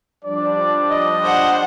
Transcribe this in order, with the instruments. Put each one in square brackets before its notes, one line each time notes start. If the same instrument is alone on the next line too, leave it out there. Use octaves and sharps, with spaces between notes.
[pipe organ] F3 G3 D4 [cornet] D5
[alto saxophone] D#5
[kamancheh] C5 F#5